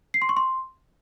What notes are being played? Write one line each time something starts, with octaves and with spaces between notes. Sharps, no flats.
C7
C6
C#6
C6